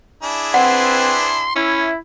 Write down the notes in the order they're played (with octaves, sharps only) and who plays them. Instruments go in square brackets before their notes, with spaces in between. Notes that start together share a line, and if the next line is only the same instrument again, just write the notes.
[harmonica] D4 E4 G#4
[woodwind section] C4 B4 [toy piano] F#5 [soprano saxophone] C6
[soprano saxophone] C#4 [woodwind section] E4